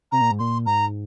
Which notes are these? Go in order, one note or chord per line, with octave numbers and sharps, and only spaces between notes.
C3 A#5
A#2
G#2
A#2 C6
G#2 A#5